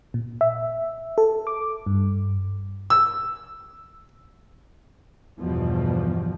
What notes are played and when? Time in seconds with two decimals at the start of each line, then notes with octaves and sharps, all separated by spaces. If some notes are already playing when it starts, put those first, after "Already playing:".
0.14 A#2
0.41 E5
1.18 A4
1.47 D6
1.86 G2
2.90 E6
5.39 E2 G2 B2 F3